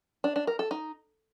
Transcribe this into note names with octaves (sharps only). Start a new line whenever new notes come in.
D4
D4
A#4
A4
D#4